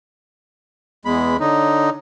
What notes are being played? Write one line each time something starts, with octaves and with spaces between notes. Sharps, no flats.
E2 G#3 B3 B5
D3 D#4 C#5